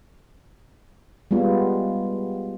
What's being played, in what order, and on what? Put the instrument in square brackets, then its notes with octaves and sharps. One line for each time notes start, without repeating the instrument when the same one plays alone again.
[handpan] G3 G#3 B3 F4